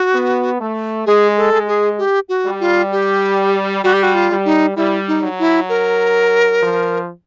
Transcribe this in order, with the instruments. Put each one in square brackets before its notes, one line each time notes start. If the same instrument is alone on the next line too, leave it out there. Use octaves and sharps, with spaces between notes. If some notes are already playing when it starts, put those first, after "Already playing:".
Already playing: [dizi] F#4
[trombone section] B3
A3
[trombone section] G#3 [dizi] G#4
[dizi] A4
[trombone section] G#3
[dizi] G#4
G4
F#4
[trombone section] G3
[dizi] F4
G4
[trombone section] G3 [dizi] F#4
[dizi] G4
F#4
F4
[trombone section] G3
[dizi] D#4
[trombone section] G3 [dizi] E4
[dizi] D#4
[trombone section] F#3
[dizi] E4
A#4
[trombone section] F3